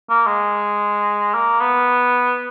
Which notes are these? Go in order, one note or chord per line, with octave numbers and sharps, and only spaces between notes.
A#3
G#3
A#3
B3